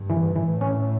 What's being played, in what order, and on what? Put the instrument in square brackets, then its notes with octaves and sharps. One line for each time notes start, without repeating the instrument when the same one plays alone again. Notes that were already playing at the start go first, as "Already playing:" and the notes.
Already playing: [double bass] G2
[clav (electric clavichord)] E3
[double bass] A2 [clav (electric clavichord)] E3
[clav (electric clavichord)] C#4